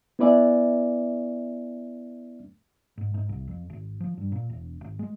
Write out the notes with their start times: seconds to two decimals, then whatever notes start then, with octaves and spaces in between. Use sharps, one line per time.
0.19 B3 E4 B4 D5 E5 G#5
2.98 G#2
3.14 G#2
3.29 C2
3.47 F2
3.70 G#1
4.00 F3
4.17 G2
4.32 A#2
4.50 E1
4.81 G#1
4.99 G#3